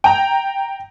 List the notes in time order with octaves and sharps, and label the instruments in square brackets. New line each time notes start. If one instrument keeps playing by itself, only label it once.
[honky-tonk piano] G5 A#5